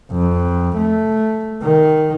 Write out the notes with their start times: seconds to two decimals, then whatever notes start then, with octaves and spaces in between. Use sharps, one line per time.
0.12 F2
0.77 A3
1.62 D#3